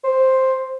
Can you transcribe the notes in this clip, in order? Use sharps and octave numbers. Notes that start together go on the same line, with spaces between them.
C5